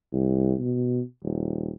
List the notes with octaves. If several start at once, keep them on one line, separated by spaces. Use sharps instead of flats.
C2
B2
D#1